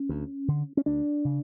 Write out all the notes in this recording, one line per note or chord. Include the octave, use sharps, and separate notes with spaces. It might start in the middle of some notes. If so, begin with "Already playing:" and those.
Already playing: C#4
D2
D3
C#4
D2 D4
C#3